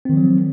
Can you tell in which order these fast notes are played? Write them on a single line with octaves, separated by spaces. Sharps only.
C4 D#3 F3 F#3